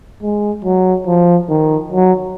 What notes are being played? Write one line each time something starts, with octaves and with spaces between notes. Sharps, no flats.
G#3
F#3
F3
D#3
F#3